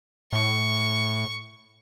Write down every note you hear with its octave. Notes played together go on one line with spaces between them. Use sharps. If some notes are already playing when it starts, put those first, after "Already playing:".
A2 C#6